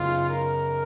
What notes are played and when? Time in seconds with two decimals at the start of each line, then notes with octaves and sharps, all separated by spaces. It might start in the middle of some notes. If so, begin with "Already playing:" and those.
Already playing: F#2 C#3 F#3 B3 D#4 F4
0.29 A#4